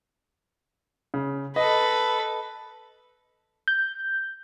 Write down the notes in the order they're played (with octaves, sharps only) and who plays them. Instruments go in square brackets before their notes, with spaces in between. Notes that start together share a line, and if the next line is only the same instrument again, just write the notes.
[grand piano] C#3
[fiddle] A4 B4 [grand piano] D#5
[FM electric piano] G6